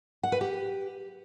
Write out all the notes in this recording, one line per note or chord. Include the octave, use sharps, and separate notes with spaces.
F#5
B4
G4